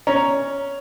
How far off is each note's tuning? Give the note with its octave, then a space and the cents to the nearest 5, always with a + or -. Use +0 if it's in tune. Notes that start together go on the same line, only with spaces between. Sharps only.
C#4 +5 A#5 +0